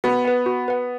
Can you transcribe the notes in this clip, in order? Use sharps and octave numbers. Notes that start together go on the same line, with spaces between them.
B3 F#4
B4 F#5
F#4
B4 F#5